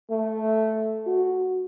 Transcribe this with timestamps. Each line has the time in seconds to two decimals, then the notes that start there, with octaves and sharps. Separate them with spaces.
0.10 A3
1.06 F#4